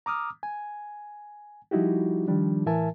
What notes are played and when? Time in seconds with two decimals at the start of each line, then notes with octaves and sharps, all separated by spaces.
0.06 A#5 D6 D#6 F6
0.43 G#5
1.71 F3 G3 D#4 E4 F#4 G4
2.28 D#3 F3 G3 D4
2.66 A2 E3 A#4 E5 G#5 A5